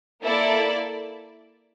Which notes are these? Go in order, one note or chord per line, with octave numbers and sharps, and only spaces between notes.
A#3 E4 A4 D5